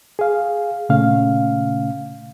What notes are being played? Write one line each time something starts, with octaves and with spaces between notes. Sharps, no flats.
G#4 F5
A#2 C#3 A3 C#4 F5